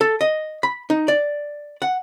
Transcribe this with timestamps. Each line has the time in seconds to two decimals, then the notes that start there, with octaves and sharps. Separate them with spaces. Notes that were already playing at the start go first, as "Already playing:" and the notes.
0.01 A4
0.21 D#5
0.63 B5
0.90 D#4
1.08 D5
1.82 F#5